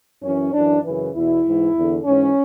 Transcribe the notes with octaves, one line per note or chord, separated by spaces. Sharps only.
F#2 E3 C#4
F#2 E3 D4
F#2 C#3 E3
E2 B2 E4
G#2 E3
E2 D3
G#2 E3 C#4